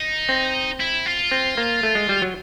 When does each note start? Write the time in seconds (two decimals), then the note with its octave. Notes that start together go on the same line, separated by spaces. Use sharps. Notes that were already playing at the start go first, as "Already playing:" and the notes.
Already playing: D#4
0.29 C4
0.80 E4
1.06 F4
1.31 C4
1.57 A#3
1.83 A3
1.95 G#3
2.09 G3
2.22 F#3